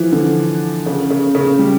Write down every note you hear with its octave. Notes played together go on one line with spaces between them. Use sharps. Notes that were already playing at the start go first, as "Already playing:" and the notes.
Already playing: E3 F3
D3
C#3
C#3
C#3
G3